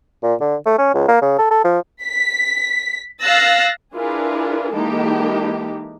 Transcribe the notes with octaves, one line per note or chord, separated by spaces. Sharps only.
A#2
D3
A3
C#4
C#2
A#3
C#3
A4
A4
F3
B6
F5 E6 F#6 A6 A#6
D4 E4 F4 G#4 A#4 B4
E3 G#3 A#3 D#4 G4 A4